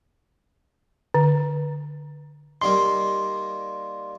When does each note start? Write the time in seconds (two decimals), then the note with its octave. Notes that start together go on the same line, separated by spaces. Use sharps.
1.14 D3
2.62 D#3 G3 A#3 C6